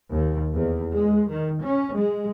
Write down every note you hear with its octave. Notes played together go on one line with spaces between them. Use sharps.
D#2
E2
G#3
D#3
C#4
G#3